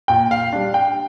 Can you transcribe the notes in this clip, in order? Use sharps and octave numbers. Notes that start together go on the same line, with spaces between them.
A#2 G5
F5
G3 D4
G5